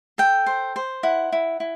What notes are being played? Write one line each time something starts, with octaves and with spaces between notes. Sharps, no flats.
A4 G5
C5
C5
E4 F#5
E4
E4